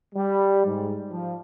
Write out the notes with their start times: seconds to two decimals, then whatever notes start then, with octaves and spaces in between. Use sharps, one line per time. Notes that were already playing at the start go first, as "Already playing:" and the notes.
0.15 G3
0.66 G#2
1.11 F3